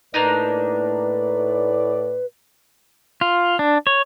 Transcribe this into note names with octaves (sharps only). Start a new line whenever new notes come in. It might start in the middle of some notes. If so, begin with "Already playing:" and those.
A2 A#3 D4 D#4 B4 D5
F4
D4
C#5